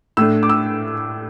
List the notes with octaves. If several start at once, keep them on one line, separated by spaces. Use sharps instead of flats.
A2 A3 D4 E6
D6
E6